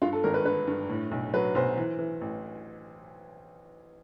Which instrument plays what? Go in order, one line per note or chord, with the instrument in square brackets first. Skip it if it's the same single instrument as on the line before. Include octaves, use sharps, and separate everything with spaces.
[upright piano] G2 F4
A4
G#1 A#4
B4
D3 B4
G2
A2
B1
F#3 B4
B1 C5
E3
E3
A1